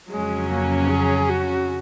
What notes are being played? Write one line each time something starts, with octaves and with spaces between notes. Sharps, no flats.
F2 C#3 F#3 G#3 C#4
A#3
G#4
F#4